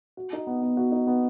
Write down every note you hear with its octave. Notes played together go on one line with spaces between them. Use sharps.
F#4
D#4
B3
B3
F#4
D#4
B3